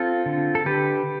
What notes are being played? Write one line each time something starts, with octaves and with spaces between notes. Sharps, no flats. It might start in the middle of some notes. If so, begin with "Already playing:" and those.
Already playing: C4 F4 A4
D3
A4
D3 G4 B4